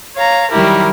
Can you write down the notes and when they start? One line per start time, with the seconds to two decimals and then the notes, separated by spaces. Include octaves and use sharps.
0.15 C#5 F5 A#5
0.51 D#3 F#3 G3 E4 G4 A#4